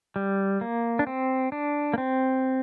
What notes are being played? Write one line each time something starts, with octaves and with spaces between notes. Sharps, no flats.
G3
A#3
D4
C4
D4
A#3
C4